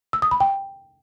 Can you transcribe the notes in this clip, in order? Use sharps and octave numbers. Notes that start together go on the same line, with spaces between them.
E6
D#6
B5
G5